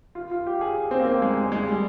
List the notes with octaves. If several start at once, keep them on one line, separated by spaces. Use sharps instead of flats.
F4
F4
G4
G#4
G#4
C4
A#3
C4
G#3
G#3
G#3
G3